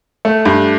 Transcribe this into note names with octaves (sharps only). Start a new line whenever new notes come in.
A3
G2